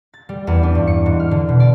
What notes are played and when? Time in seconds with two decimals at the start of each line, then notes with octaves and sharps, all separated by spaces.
0.14 A6
0.29 G3
0.47 E2
0.63 D4
0.75 G2
0.87 C#7
1.06 G#2
1.20 F6
1.31 D3
1.49 B2
1.60 D5